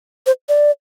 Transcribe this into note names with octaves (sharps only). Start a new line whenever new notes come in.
C5
D5